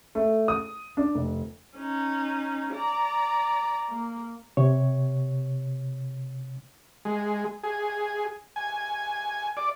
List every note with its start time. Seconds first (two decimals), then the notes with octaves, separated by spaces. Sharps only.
0.15 A3
0.48 D#6
0.97 D4
1.15 F1
1.77 C#4 D#4
2.74 D5 A#5
3.89 A#3
4.57 C3 C#5
7.05 G#3
7.63 G#4
8.56 G#5
9.57 D5